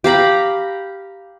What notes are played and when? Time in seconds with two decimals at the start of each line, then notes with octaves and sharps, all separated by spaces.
0.04 G4 F5 A#5 B5